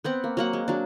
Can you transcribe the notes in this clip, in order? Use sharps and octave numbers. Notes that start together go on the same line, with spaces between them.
B3 C4 F#5
A#3
F#3 A#3 F#5
G#3
F#3 D4